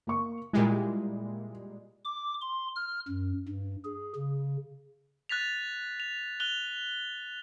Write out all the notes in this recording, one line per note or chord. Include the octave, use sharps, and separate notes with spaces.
A#3 C#6
A#2 G3 G#3 E4
D6
C6
F6
F#2
G2
G#4
C#3
F#6 A6 B6 F7
F7
F#6 F7 G7